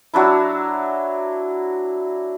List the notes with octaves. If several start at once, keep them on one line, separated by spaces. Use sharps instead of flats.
F#3 D4 E4